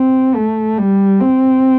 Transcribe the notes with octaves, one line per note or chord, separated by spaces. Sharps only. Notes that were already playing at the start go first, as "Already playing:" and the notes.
Already playing: C4
A3
G3
C4